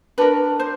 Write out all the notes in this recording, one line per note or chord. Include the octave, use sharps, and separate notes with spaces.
D4 F#4 A#4 B4
C5